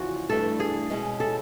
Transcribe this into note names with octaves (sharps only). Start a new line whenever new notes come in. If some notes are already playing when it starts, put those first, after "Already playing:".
Already playing: E2 C#3 F3 F#4
G2 E3 A3 D4 A4
G#4
B2 G#3 C#4 E4
A4